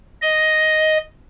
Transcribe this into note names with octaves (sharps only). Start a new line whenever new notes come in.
D#5